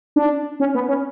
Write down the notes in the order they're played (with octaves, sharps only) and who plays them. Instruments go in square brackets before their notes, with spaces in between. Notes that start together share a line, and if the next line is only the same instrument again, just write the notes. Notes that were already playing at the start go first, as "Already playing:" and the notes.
[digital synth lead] D4
C#4
B3
C#4